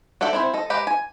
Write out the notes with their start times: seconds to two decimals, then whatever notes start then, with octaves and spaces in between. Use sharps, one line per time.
0.21 D4 A4 E5 F#5 G5
0.33 C4 E4 C5
0.54 A4 D#5
0.70 G#3 G4 B4 A#5
0.87 G#5